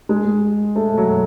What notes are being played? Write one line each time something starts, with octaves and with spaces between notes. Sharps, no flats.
G#3
A3
F#3